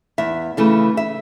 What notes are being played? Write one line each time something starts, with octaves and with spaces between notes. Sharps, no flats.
E2 E5
C#3 E3 A3
E5